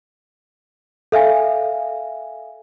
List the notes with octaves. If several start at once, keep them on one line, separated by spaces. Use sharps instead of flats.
A4 E5 F5 G#5